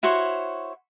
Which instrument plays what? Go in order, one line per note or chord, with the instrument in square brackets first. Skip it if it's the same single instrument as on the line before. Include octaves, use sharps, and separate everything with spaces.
[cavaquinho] E4 F#4 C5 C#5